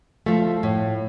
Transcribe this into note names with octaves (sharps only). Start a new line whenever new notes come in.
F3 A3
A2